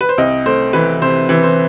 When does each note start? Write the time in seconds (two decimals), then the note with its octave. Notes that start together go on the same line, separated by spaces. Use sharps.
0.01 B4
0.09 C5
0.18 C2 D#5
0.46 A3 C5
0.73 E3 B4
1.02 C3 C5
1.29 E3
1.43 C5